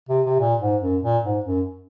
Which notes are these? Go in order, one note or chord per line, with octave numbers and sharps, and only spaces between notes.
C3
C3
A#2
G#2
F#2
A#2
G#2
F#2